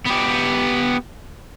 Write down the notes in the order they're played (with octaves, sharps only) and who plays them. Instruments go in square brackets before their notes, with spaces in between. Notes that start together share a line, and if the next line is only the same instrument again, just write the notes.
[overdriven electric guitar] B3 G4